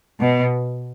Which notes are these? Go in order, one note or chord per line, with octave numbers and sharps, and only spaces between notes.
B2